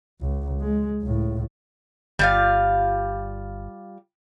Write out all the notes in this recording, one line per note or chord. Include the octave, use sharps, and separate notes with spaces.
C#2
G#3
C#2 A2
G1 G3 F4 F5